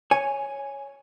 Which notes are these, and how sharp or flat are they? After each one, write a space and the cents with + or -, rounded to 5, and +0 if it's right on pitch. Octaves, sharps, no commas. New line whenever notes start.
C#5 +0 G#5 +0